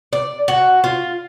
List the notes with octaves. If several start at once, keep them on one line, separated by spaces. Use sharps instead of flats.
D5
F#4
F4